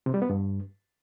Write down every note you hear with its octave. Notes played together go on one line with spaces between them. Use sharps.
C3
G3
B3
G2